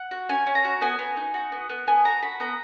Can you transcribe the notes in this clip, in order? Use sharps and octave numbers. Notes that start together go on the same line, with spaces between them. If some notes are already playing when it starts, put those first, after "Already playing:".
Already playing: F#5
F#4
C#4 G#5
C#4
A#5
F#4
B3 G#5
B3
D#4
F#4
B3
B3
B3 G#5
F#4 A#5
F#4 B5
B3 A#5